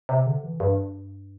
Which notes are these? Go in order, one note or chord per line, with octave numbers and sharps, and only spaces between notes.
C3
D3
E3
G2